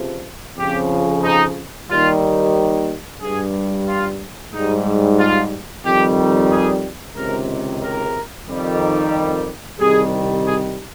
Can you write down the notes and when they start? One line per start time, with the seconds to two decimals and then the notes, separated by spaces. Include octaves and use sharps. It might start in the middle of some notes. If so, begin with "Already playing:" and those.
Already playing: C#2 C3 F3
0.58 F2 C#3 F3 G4
1.24 D#4
1.89 D#2 D#3 G3 F4
3.21 G2 G3 G#4
3.87 F4
4.53 G#2 G3 D#4
5.19 F4
5.85 F2 D#3 G3 G4
6.50 G#4
7.16 C#2 C3 D#3 A#4
7.83 A#4
8.48 F2 D#3 G3
9.80 C2 C3 D#3 G3 G#4
10.46 G#4